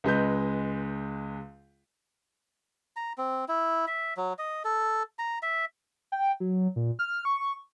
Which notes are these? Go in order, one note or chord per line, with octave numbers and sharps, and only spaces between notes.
C#2 G#3 B4 G6
A#5
C4
E4
E5
F#3
D#5
A4
A#5
E5
G5
F#3
A#2
F6
C#6